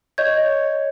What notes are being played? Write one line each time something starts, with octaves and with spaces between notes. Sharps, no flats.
C#5 D#5 G6 G#6